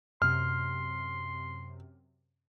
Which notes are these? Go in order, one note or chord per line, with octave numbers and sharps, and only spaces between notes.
F#2 C3 C6 F6